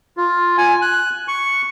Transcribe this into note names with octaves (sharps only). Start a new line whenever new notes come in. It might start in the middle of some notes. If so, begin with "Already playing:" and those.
F4
G#5
F#6
C#6